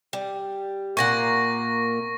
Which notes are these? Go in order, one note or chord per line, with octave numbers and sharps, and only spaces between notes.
G3
A#2 A#3 F#5 C#6 A#6